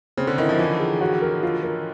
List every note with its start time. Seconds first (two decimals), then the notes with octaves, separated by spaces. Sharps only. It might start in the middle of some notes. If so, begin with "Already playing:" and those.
0.17 C#3 C4
0.27 D3
0.38 D#3 E4
0.49 F3
0.59 E3 F4
0.80 G#4
1.01 F#4
1.22 A#4
1.43 F4
1.63 A#4